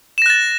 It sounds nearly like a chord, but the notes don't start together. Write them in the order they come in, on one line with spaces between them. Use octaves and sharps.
E7 A#6 F#6 A6